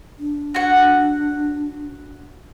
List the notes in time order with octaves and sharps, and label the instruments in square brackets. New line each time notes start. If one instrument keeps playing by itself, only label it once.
[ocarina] D4
[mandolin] F#4 F#5